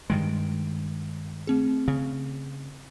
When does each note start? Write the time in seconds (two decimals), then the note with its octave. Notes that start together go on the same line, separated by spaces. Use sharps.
0.10 G2 D#3 G#3 D7
1.47 A3 C4 G#4
1.88 C#3